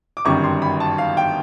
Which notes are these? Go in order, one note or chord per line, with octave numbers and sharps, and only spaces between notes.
D6
G1 F#2 D#3 G3 C#6
C6
B5
A5
F5
G5